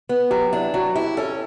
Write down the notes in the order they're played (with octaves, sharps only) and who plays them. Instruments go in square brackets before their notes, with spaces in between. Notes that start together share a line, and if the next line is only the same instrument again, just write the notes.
[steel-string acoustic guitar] B3
[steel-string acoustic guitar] F#3 [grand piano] G4
[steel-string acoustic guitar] D4 [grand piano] E4
[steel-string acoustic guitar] F#3 [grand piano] F#4
[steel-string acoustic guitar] E4 [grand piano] G4
[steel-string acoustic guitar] C#4 [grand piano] A4